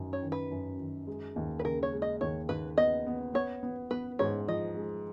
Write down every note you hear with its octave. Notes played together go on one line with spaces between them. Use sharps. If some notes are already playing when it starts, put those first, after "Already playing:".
Already playing: F#2 D#3
C#5
D#3
B4
F#2
D#3
G#3
D#2
B4
C#3 A#4
C#5
G#3
D#5
D#2 C#5
D#2 B4
B3 D#5
B3
B3 C#5
B3
B3 B4
G#2 C#5
F3 D#5
G#3